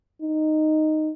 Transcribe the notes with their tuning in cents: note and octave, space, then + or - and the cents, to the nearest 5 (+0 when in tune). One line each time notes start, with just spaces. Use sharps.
D#4 -5